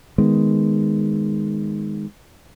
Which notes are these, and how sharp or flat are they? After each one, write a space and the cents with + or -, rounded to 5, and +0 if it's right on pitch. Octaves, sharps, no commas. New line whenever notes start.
D#3 +0 G#3 +0 B3 +0